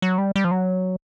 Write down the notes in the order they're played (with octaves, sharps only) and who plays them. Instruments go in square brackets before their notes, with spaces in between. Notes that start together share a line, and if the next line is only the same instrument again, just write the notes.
[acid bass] F#3
G3
G3
F3
F#3